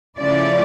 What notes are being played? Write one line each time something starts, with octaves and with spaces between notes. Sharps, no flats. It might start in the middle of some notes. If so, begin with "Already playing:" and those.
C#3 F3 A3 C#4 E4 D5